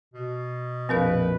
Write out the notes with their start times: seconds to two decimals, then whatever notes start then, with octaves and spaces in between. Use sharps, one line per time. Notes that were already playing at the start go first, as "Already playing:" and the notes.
0.14 B2
0.89 A#1 F2 C4 A#4 B4 F5